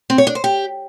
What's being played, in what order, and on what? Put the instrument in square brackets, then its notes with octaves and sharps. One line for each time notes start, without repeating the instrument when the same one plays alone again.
[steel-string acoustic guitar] C4
C#5
D4
C5
G4